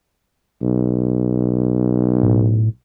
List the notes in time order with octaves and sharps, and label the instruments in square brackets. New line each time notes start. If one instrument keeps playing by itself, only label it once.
[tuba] B1
[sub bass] A2